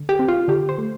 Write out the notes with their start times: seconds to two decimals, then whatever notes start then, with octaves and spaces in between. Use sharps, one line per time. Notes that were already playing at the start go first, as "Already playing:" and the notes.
Already playing: D3
0.09 G4
0.19 C4
0.28 F4
0.48 D3 G4
0.69 C5
0.78 A3